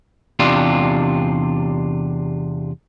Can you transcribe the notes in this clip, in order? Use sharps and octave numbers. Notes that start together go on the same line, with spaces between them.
E2 C3 D4 F4 G4